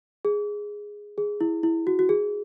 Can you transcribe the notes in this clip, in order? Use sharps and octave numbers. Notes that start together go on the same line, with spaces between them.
G#4
G#4
E4
E4
F#4
F#4
G#4